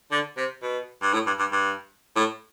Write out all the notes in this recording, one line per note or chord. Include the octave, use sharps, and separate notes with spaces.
D3
C3
B2
G2
A2
G2
G2
G2
A2